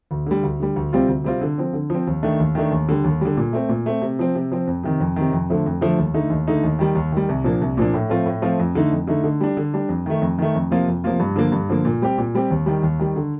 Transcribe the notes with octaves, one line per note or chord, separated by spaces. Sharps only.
D2
D3 G3
D2
D3 G3
D2
C3 G3 C4 F4
D2
C3 G3 C4 F4
D3
F3 C4
D3
F3 C4
D#2
D#3 A3 D4
D#2
D#3 A3 D4
D#2
D3 G3
D#2
D3 G3
A#2
A3 C4
A#2
A3 C4
C3
F3 C4
C3
F3 C4
F2
C3 D#3
F2
C3 D#3
F2
D3 F3 A3
F2
D3 F3 A3
D#2
D3 A3 D#4
D#2
D3 A3 D#4
D#2
D#3 G3
D#2
D#3 G3
C2
A#2 F3 A#3 D4
C2
A#2 F3 A#3 D4
A2
F3 A3 C4 F4
A2
F3 A3 C4 F4
F2
D3 A3 D#4
F2
D3 A3 D#4
D3
G3 D4
D3
G3 D4
F2
D#3 A3
F2
D#3 A3
F2
C3 F3 A#3 F4
F2
C3 F3 A#3 F4
G2
D3 F3 A#3
G2
D3 F3 A#3
A#2
G3 C4 G4
A#2
G3 C4 G4
D#2
D#3 G3
D#2
D#3 G3
D3